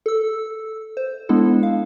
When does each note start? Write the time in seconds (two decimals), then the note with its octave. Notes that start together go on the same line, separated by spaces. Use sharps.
0.06 A4 E6
0.97 C5
1.29 G#3 B3 D4 E4 A4
1.63 F5